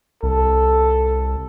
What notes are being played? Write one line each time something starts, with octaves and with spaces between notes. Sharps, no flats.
C2 A4